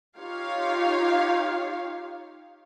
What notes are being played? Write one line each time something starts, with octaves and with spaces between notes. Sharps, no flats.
D#4 F4 G4 C#5 F5